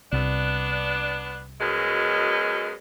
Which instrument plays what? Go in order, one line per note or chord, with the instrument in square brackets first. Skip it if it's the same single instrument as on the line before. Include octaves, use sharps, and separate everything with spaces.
[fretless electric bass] C2 [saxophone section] B3 D4
[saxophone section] F#2 B2 G#3